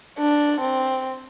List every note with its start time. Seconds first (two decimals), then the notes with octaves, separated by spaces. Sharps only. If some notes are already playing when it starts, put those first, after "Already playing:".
0.19 D4
0.60 C4